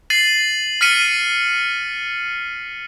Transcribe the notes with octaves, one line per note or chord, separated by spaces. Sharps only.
A6 C7 D#7 F#7
F6 A6 B6 C#7 D#7